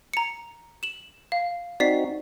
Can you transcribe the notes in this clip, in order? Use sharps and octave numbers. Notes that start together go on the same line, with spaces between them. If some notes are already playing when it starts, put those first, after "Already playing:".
A#5 C#7
E7 F#7
F5
C4 D#4 F#4 D5 B6 C7